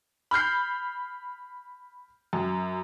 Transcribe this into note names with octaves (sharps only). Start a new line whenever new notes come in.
B5 F6 G6 C7
F#2